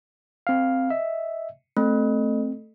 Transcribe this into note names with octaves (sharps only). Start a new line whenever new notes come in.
C4 F5
D#5 E5
A3 C4